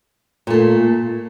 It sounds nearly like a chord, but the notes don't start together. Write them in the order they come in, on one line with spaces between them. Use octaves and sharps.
A#2 A3 A#3